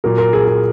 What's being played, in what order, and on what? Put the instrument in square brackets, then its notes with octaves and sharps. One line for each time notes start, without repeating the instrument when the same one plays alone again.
[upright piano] A#2 F#3 A#4
A#4
G#4
G#4